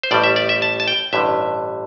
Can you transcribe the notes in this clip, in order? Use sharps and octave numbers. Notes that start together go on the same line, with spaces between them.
C5
A1 A2 G3 D5
E5
D5
E5
A5
A5
G5
A1 G2 D3 E5